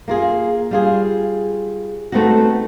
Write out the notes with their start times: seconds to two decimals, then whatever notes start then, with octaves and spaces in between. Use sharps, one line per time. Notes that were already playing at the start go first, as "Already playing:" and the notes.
0.08 A#3 F4 G#4
0.71 G3 F4 G#4
2.12 A3 B3 C4 D#4 F#4